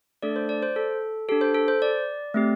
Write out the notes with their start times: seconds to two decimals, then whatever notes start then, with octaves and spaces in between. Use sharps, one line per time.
0.22 A3 D4 A4 D5
0.36 C5
0.49 D5
0.62 C5
0.76 A4
1.28 D4 G4 A4
1.41 C5
1.55 A4
1.68 C5
1.82 D5
2.34 A3 C4 G4